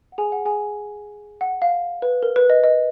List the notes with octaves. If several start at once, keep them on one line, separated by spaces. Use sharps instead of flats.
F#5
G#4 G#5
F#5
G#4 G#5
F#5
F5
B4
A#4
B4
D#5
D#5